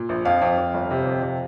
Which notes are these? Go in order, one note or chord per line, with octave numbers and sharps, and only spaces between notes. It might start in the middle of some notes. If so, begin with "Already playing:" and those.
Already playing: A#2
A#1
F2 F5
F2
F2
G1
C3
F2
C3